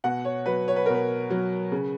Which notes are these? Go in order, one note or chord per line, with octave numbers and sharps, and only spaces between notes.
B2 F#5
C#5
F#3 B4
C#5
B4
B2 A#4
B4
F#3
C#3